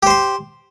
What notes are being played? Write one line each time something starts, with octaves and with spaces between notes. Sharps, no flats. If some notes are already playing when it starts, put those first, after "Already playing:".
G4 C5 C6